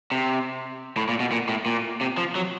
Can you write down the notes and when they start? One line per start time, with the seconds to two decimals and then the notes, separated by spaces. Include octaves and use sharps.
0.12 C3
0.97 A2
1.09 A#2
1.20 B2
1.32 A#2
1.49 A2
1.66 A#2
2.01 C3
2.17 F3
2.35 F#3